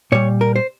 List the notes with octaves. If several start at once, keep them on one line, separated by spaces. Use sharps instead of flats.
A#2 G3 C#5
A#4
C5